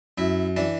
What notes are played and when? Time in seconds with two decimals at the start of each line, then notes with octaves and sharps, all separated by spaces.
0.18 F#2 E4
0.56 E3 D4